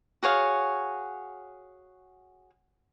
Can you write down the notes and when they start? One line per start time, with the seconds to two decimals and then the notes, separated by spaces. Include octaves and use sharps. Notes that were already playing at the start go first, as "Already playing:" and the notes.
0.23 F#4 G#4 C#5 F5